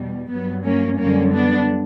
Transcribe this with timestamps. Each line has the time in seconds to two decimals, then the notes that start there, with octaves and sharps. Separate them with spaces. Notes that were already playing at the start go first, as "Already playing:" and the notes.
Already playing: E2 B2 G3
0.29 G2 F#3 B3
0.64 A#3 C#4
0.99 F#2 D3 G3 A#3 C#4
1.33 B3 D4